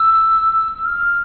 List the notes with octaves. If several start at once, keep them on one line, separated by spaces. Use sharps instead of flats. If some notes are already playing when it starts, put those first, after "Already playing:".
Already playing: E6
E6
F6